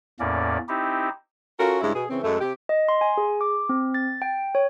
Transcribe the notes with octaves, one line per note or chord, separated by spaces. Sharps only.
E2 A2 A#3 C#4 D5
C4 D#4 E4 G4
C#4 F4 F#4 A4 A#4
G2 C#3 G#3 E4
B2 G#4
C#3 E3 C4
F#2 G#3 A3
C3 G4
D#5
C6
G#5
G#4
D6
C4
A6
G5
C#5